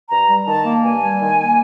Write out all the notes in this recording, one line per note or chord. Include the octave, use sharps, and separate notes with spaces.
G2 A#5
G3
D#3 A5
A#3
G2 G#5
G3
D#3
A#3